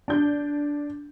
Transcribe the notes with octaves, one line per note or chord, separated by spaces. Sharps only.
D4 G6